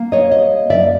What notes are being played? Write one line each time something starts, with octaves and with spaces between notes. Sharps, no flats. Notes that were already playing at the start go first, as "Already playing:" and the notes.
Already playing: A#3
C#5 D#5
G3 C#5 D#5
F#2 D5 E5